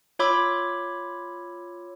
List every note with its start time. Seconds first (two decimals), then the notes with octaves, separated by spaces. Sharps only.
0.19 F4 C#5 B5 D6 E6